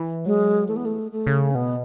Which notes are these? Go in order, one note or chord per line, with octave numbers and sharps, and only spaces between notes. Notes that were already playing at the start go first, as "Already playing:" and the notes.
Already playing: E3
F#3 G#3
E3 A3
B3
A3
A3
C#3
C#4
B2 B3